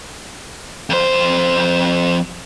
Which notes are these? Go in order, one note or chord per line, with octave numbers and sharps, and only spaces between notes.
F2 C5